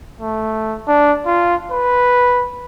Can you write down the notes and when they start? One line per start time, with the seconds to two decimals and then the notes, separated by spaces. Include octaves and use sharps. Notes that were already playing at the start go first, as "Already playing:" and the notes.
0.20 A3
0.88 D4
1.26 F4
1.72 B4